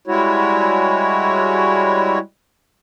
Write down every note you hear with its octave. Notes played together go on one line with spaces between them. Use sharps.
G3 G#3 E4 F#4 C#5